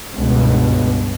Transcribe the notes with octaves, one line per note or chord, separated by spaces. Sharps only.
C#2 G2 B2